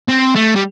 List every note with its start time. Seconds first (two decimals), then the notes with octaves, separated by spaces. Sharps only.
0.09 C4
0.36 A3
0.56 G3